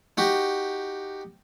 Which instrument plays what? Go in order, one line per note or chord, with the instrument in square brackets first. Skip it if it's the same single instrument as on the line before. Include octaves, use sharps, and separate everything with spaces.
[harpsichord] D#4 F#4 G4